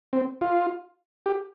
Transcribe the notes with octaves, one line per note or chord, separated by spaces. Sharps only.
C4
F4
G4